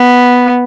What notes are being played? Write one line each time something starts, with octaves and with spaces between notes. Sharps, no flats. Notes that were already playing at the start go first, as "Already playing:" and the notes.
Already playing: B3